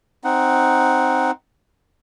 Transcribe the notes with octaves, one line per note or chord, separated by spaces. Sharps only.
C4 D#4 F#5